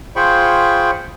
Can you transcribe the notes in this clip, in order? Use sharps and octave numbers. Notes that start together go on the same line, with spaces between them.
F4 G#4 C5 G5 B5 C#6